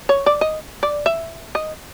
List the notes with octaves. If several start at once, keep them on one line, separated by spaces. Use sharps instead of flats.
C#5
D5
D#5
D5
E5
D#5